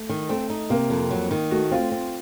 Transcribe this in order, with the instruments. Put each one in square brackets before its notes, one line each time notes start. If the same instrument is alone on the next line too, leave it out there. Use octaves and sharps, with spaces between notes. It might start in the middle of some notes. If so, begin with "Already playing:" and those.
Already playing: [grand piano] A3
[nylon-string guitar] D#3
[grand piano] A3 [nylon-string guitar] C4
[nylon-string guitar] D#4
[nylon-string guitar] C3 [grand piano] A#3
[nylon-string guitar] F2
F#3
D#3
[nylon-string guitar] A3 [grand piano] F#4
[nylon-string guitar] C4 [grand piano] F4
[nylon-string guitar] C4